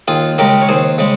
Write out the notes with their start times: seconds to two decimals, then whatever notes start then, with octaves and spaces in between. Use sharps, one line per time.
0.08 D#2 F4 G#4
0.38 C#3 G#3 G4 A#4
0.62 C#5
0.69 D#2 G#4 C5
0.98 C#3 G#3